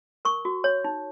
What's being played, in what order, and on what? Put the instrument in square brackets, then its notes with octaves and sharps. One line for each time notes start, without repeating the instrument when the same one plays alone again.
[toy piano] A#4 C#6
F#4
C#5
D#4